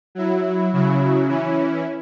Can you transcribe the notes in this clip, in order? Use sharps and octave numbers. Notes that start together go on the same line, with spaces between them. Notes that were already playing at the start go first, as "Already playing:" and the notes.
F#3 E4
C#3 F#3 E4
E3 C#4 E4